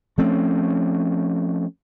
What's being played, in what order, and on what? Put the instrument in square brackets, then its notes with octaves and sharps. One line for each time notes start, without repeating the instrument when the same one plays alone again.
[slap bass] F3 A3 C4 C#4